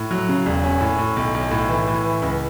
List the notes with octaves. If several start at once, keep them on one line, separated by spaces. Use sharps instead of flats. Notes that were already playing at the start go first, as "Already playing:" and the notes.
Already playing: A2
F#3
C#3
E1
C#4
A2
A2
B1
B1
A2
E3
A2
E3
C#2